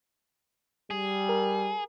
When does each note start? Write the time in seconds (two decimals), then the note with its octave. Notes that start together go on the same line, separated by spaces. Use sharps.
0.91 G3 G#4
1.29 A#4